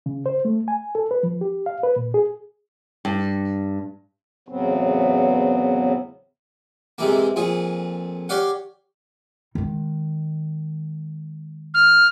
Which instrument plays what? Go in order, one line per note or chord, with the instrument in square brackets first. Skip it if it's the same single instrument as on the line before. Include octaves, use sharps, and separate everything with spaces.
[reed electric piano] C#3
C5
A3
G#5
A4
B4
F3
G4
F5
B4
A#2
G#4
[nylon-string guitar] G2
[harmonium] E2 A2 C#3 F#3 B3 C4
[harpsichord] G#2 C3 E3 A#3
F2 A#2 G#4
G4 C#5 D5 F5 F#5
[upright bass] D#3 G#3
[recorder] F6